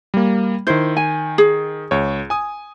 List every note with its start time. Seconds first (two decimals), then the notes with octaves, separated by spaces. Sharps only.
0.14 G3 A#3
0.67 D#3 E4 C5 G6
0.97 G#5
1.38 G#4
1.91 C#2 C#5
2.30 G#5 D#6